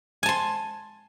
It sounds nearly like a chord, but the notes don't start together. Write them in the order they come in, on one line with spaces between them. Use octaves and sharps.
G#5 A5 C6